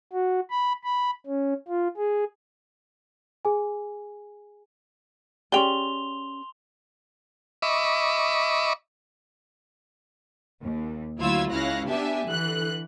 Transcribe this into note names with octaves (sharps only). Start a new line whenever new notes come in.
F#4
B5
B5
C#4
F4
G#4
G#4 G#5
C#4 G4 G#4 D5 G5 C6 F7 G7
D#5 E5 B5 C#6 D6
D#2
D2 F#3 E4 F4 E6 G#6
C#2 C#4 E4 F5 F#6 A#6
B3 D4 G4 E5 G#5 A5
D3 E3 F#6